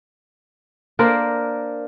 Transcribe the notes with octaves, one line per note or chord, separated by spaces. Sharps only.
A#3 D4 A#4 C5